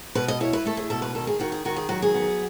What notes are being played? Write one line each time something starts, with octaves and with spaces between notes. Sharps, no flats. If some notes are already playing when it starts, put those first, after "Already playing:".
B2 B4
D#5
E4 C#5
B4
A3 A4
G#4
B2 A4
B4
D#3 A4
G#4
D#3 F#4
G#4
D#3 F#4
G#4
F#3 F#4
G#4
B3